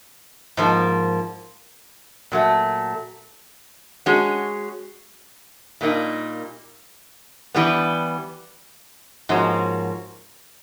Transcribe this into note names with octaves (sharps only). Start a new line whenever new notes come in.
G#2 F3 A#3
A#2 F#3 A3
G#3 C#4 F#4
A#2 G3 A#3 D#4
E3 G3 B3
G#2 F3 A#3 C#4 F#4